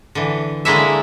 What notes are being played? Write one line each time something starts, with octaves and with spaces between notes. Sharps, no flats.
D3 E3
D3 G#3 A#3 E4 C#5 E5